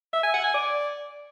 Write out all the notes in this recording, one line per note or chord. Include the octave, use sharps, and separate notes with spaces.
E5
G#5
F#5
G#5
D5